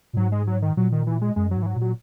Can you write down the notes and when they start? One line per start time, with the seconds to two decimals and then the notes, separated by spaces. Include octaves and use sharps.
0.13 A#2
0.17 G#2 F#3
0.32 G#3
0.47 F#3
0.62 D#3
0.77 A#2 F#3
0.92 D#3
1.07 E3
1.21 G#3
1.36 F#2 G#3
1.51 F#3
1.56 G#2
1.63 E3
1.66 F#3
1.76 A#2
1.81 F#3